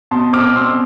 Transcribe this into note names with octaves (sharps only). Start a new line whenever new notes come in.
B2 A5 C6
C4 D6 F6
B2 C6 E6